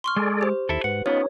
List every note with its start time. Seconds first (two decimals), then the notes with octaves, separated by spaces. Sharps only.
0.04 C6 C#6 F6
0.16 G#3 G#4 A4 D5
0.41 G4 C5
0.69 D#2 E4 A4
0.84 G#2 B4 F#5
1.06 B3 C#4 D#4 F4 C#5